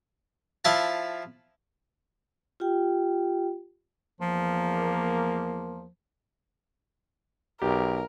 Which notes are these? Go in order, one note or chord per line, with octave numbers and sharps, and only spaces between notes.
F3 E4 E5 F5 A5
F4 G4 G5
E2 F3 A#3
B1 G4 A#4